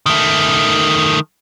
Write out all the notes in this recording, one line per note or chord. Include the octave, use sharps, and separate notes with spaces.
D#3 A3